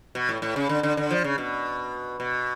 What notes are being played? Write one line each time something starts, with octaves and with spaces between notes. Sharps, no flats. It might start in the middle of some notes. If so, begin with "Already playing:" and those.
B2
A2
A2
C#3
D3
D3
D3
F3
C#3
B2
B2